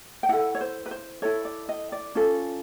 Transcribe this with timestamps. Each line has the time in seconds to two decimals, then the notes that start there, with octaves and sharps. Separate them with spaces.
0.23 G5
0.29 E4 A4 F#5
0.55 C#5
0.61 C5
0.86 B4
0.91 C5
1.22 E4 A4 C#5
1.45 D5
1.69 D#5
1.92 D5
2.15 C#4 F4 A4